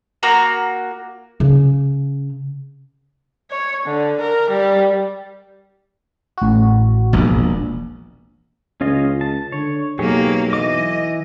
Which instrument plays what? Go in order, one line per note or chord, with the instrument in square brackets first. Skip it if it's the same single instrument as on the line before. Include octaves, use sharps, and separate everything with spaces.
[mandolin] A#3 F#4 A#5
[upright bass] C#3 C#4
[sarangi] C#5
D3
A#4
G3
[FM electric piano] A1 F#4
[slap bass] E1 A#1
[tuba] C#2 [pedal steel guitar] C#4 F4 D#5
[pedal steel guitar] A5
[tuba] D3 [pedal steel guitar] C#5
[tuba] B1 [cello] F#3 A#3 [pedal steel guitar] G4 G#4 C#5
[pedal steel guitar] E3 D6 [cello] D#5